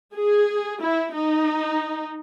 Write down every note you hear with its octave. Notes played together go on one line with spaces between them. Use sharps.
G#4
E4
D#4